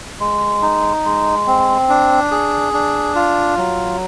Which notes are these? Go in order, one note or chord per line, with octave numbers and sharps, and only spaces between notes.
G#3
D#4
G#3
C4
D4
G#4
D4
F4
F#3